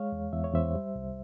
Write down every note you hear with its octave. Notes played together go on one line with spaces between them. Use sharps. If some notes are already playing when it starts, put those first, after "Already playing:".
Already playing: G#3 C#5 F5
E2
E2 E5
C#5
E2 C5 E5
G3
C2